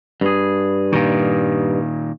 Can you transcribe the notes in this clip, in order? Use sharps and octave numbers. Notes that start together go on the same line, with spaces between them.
G2 G#4
A#2 D#3